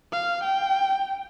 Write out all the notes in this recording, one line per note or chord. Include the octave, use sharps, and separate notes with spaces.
F5
G5